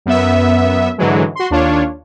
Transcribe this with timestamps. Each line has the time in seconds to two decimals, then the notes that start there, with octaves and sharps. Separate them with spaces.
0.06 F#2 B3 E5
0.98 G#2 D3 E3 F#3 G#3
1.35 F#4 C6
1.50 D#2 D4 F4 C#5